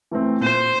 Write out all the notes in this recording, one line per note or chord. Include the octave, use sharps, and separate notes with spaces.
E3 A3 C4
A#2 C5